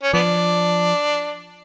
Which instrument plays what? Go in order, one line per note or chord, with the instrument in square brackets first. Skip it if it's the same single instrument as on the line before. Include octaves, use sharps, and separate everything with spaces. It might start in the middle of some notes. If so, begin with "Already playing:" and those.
[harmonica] C#4
[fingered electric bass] F3 [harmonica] B3 D4